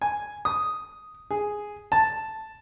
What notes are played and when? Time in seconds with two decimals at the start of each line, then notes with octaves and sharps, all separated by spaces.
0.02 G#5
0.45 D#6
1.31 G#4
1.92 A5